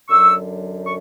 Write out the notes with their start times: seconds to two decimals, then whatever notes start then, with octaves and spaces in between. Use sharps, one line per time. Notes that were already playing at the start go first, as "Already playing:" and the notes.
0.08 F#2 D3 F#3 C#6 E6
0.85 C#6